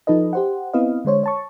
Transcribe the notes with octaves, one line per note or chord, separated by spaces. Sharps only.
F3 D#4 A4 B4 D#5
G4 C5 F#5
B3 C4 E4 B4 D#5 F5
D3 G#3 C5 C#5
C#5 A5 C#6